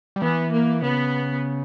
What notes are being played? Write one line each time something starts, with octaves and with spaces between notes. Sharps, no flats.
G3
E3 B3
A#3
C#3 B3